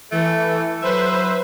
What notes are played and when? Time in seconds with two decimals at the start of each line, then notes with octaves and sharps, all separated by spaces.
0.12 E3 A3 A4
0.82 F#3 B4 C5 E5